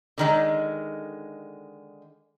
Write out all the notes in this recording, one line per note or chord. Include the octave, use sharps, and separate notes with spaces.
D3 D#3 G#3